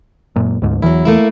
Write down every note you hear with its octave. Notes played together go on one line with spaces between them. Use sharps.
F#2 A#2
D2 G#2
E2 E3 F#3 E4
A3 A#3 E4